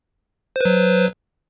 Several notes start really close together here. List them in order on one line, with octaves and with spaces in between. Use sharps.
C5 B4 F#3